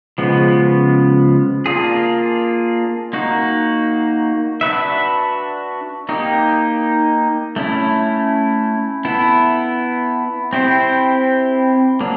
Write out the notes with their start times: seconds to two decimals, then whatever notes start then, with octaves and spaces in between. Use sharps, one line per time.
0.18 C#3 F3 G#3 B3
1.66 A#3 D4 F4 G#4
3.13 A#3 D#4 F#4
4.61 D4 F#4 B4 E5
6.09 A#3 D#4 G4
7.56 A3 C#4 E4
9.05 B3 E4 A4
10.53 C4 E4 G4 C5
12.00 F#3 A#3 D4